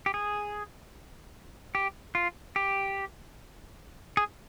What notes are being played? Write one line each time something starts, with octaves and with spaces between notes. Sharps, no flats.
G4
G#4
G4
F4
G4
G#4